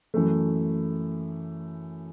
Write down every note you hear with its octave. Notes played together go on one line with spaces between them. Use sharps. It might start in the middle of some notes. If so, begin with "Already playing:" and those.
F#2 E3 A3